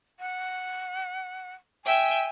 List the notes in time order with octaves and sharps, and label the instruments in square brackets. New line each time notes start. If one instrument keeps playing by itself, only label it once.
[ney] F#5
[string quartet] E5 G5 [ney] G#5